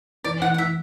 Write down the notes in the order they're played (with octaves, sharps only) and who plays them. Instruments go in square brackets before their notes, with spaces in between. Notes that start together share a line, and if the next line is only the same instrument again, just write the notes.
[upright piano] E3 [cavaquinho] D5
[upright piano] E3 [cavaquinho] F#5
[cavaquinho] F#5
[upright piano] E3 [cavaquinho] E5